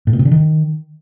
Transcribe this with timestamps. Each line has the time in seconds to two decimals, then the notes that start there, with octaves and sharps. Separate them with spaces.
0.07 A2
0.13 B2
0.19 C3
0.25 D3
0.31 D#3